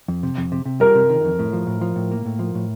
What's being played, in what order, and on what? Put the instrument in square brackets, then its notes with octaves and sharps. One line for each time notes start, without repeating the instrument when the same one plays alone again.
[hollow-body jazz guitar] F2
C3
F2
C3
C3
[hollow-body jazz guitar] G3 [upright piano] A#4
[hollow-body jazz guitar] C3
D#3
F2
A2
F3
A2
F3
A2
A#3
A2
F3
A2